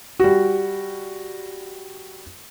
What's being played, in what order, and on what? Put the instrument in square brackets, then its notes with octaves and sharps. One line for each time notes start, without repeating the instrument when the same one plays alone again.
[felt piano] G3 F#4